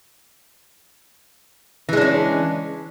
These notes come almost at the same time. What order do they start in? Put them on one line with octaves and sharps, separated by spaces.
E3 G#3 D4 C#4